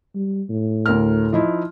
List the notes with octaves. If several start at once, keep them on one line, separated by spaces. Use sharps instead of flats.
G3
A2
D2 A#4 F6
F3 D#4 E4